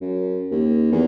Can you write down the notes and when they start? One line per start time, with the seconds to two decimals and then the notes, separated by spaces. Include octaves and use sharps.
0.01 F#2
0.51 D#2
0.92 E2